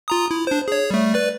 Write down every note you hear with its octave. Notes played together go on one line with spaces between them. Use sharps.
F4 A#5 D#6
E4
D4 C5
G#4 C#5
G3 A3
B4 D5